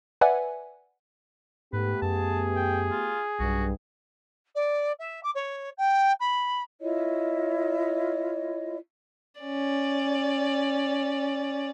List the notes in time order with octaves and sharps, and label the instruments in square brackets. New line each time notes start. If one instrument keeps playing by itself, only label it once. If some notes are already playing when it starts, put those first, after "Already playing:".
[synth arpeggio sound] B4 D5 E5 F#5 G#5
[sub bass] G#2 [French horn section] A3 B3 G4 [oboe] B4
[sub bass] F#2 [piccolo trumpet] G#4 [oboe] A5
[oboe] G5
F4
[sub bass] B1 [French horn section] G2 [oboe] F#4
[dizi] D5
E5
D6
C#5
G5
B5
[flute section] E4 F4 C#5 D#5
[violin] C#4 D5